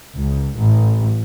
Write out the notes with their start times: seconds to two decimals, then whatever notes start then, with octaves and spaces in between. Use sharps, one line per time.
0.16 C#2
0.57 A1